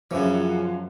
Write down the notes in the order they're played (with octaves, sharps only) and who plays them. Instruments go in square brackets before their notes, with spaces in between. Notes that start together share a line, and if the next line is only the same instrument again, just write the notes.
[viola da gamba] F#2 [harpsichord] C#3 E3 [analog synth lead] F3